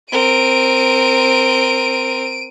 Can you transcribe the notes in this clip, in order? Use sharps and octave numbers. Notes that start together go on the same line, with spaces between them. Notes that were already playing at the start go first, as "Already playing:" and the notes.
C4 A#4 D7 D#7